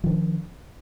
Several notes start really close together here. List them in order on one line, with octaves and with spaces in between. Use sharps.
F3 D#3 D4